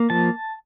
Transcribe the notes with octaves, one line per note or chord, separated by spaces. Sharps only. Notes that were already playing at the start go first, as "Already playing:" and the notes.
Already playing: A#3
F3 A5